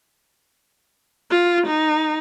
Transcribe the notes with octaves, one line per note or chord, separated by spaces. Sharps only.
F4
D#4